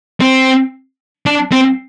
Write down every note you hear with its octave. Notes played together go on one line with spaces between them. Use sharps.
C4
D4
C4